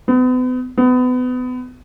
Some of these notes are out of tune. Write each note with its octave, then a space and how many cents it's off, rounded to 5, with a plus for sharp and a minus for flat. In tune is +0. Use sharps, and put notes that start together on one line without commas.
B3 +40
B3 +30